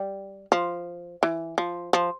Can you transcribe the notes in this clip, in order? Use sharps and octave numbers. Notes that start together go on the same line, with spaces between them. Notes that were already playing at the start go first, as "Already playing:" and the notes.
Already playing: G3
F3
E3
F3
F3